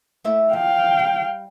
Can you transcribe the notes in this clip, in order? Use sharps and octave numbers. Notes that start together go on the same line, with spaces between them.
A3 E4 E5
F3 F5 G5
G3